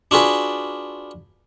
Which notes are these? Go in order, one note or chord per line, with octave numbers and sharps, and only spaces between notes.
D4 F4 F#4 G#4 B4